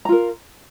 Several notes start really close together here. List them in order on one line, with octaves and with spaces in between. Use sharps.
A#5 F4 A#4